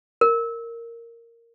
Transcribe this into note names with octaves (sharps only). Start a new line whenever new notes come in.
A#4